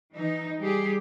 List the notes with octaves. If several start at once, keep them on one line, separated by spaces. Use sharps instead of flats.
E3 D#4
G3 G4 G#4